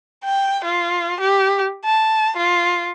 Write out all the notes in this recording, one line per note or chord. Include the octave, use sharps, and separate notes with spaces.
G5
F4
G4
A5
F4